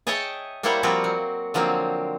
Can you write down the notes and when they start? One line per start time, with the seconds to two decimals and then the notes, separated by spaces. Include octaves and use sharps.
0.07 G#4 C#5 D#5 E5 G5 A5
0.63 G3 A#3 E4 C5 C#5 F#5
0.83 F3 G3 A#3 C4 F4 F#4
1.04 F#3
1.54 D3 F3 F#3 A#3 C4